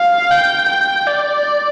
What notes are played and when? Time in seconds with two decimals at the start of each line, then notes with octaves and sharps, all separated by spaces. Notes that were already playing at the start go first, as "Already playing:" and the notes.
Already playing: F5
0.31 G5
0.69 G5
1.07 D5